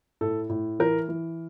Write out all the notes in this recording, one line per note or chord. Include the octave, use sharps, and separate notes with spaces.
A2 A4
A2
E3 A#4
E3